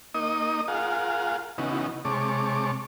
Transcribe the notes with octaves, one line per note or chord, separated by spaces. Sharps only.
A#3 D#4 D#5 D#6
F4 G#4 A#4 F5 F#5
C#3 E3 B3 D#4 F#4
C3 G#3 C#5 A5 D6